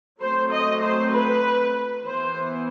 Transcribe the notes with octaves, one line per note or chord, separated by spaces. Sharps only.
F#3 A3 C4 C5
D#5
C5
B4
E3 B3 C5